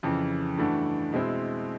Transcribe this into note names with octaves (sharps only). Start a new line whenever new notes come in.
F2 C#3 E3
G2 E3 A3 D4 F#4
B2 G#3 C4 E4